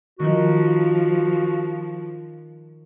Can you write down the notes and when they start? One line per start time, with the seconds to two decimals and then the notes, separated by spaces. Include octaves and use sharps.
0.19 D#3 F3 F#4